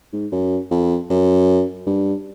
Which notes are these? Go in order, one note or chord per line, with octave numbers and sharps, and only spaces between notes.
G#2
F#2
F2
F#2
G2